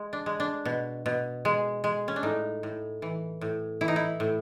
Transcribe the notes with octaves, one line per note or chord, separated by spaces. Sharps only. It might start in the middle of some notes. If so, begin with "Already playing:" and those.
Already playing: G#3
D4
G#3
D4
B2
B2
G#3
G#3
C#4
D4
A2 D#4
A2
E3
A2
E3 E4
D#4
E4
A2